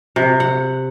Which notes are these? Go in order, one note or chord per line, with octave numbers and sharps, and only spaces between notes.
C3
F#5